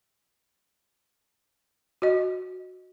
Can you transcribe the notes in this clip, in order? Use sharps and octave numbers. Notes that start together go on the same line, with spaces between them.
F#4 D#5